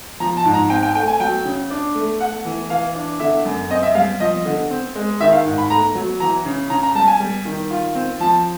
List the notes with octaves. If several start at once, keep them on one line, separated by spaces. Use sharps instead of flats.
F3 A#5
A5
G#2
A#5
C4 G5
G5
A3 G5
G#5
F#3 G5
C#3
D4
A3
A3 F#5
E3
E3 F5
D4
D3 E5
F#2
C4 D#5
E5
G3 F5
F3 D#5
D3
C4
G#3
D#3 E5
F5
G#2
B5
A3 A#5
F#3
E3 A#5
C#3
C#3 A#5
A#5
G3 A5
G#5
G3
D#3
F4
C4
F3 A5